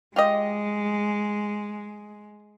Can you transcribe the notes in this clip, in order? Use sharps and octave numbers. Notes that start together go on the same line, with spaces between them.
G#3 F4 G4 D#5